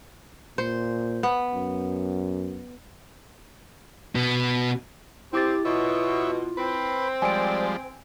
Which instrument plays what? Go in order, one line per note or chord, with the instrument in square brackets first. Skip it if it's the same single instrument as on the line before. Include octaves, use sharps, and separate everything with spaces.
[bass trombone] A#2 [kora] C5
[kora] B3
[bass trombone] F#2
[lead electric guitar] B2 B3
[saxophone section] C4 [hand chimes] E4 D6 A6 [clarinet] G4
[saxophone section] B2 [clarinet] F4 [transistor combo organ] C#5 E5
[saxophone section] C4 [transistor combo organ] B4
[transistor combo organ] F3 G3 G#3 [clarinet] D5 [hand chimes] G#5 D7